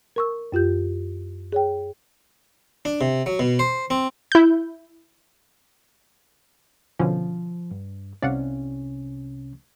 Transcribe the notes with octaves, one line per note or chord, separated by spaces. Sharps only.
A#4 C#6 E6
F#2 F4 G4 G6
G#4 C#5 G5
D4
C3
F#3
B2
C5
C4
E4 G6
B2 D3 F3 C#4
G2
C2 C3 C#4 D5 F5 F#5